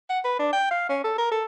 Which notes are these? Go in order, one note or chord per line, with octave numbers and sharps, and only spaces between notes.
F#5
B4
D4
G5
F5
C#4
A4
A#4
A4